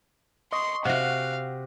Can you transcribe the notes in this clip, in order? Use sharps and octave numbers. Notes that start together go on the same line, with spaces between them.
D#5 C6 C#6
C3 F#4 F5 F#5